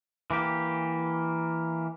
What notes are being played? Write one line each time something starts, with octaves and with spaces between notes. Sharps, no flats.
E3 A#3 G4